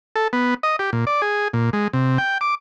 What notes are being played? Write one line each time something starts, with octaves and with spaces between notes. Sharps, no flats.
A4
B3
D#5
G4
A#2
D5
G#4
A#2
G#3
C3
G5
D6